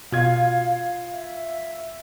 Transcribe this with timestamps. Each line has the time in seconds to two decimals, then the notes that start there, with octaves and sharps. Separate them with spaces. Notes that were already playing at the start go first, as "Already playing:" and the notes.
0.12 B2 F4 F5 G#6
1.12 E5